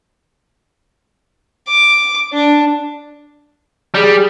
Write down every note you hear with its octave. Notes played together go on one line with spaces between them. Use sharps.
D6
D4
G3 G#4